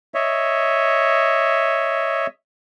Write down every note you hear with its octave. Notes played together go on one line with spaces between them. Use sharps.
C#5 D#5 E5